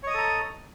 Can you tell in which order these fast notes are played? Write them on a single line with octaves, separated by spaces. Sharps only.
C#5 D#5 D#6 A4 A#5